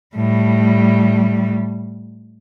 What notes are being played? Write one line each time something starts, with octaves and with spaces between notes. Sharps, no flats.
A2 G3